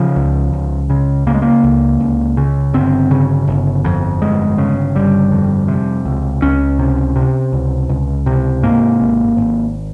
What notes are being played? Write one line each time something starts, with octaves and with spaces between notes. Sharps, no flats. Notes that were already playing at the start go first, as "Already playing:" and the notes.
Already playing: C#3 F3
C#2
C#2
C#3
C#3 A#3
G#3
A#3
C#2
C#2
C#3
G1 C4
C#3
G1
F2
G1 G#3
C#3
G1 G3
F2
C3
C#2
C#2 C#4
C3
C3
C#2
C#2
C3
G#2 A#3
G#1
G#1